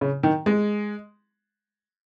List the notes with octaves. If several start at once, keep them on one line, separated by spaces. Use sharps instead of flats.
C#3
D#3
G#3